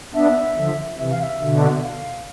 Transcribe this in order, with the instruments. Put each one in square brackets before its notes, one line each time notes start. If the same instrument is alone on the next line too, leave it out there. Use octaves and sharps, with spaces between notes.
[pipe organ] B3 D4 [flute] E5
[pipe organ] D3 F3
[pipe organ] C3 E3 [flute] E5
[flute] F5
E5
[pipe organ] B2 D3
[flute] F5